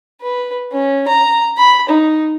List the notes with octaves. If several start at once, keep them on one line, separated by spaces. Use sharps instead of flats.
B4
C#4
A#5
B5
D#4